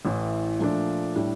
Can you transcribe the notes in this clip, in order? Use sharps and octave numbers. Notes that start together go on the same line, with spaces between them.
A1 A2 E3
A#2 F3 A3 D4
A2 G3 D4